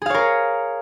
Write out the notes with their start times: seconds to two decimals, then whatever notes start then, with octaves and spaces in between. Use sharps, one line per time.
0.02 G#4
0.06 F5
0.10 C#5
0.14 A#4